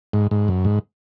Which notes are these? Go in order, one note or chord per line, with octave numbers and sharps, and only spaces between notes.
G#2
G#2
F#2
G#2